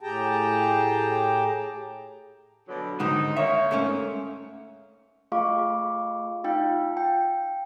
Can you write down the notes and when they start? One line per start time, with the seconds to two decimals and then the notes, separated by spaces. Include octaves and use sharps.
0.01 A2 G4 G#4 G5 A5 A#5
2.67 B2 D3 F#3
3.00 G#2 D3 D#3 D#4
3.37 A#3 C#5 E5
3.71 G#2 A3 C#4
5.32 A3 F4 G#4 F5 C#6 D6
6.44 D#4 F4 F5 G5
6.97 G5